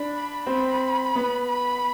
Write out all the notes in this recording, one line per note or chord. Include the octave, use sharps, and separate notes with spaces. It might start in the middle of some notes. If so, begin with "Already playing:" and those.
Already playing: D4 B5
C4 B5
B3
B5